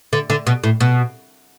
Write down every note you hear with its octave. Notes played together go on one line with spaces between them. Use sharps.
D3
D3
B2
A2
B2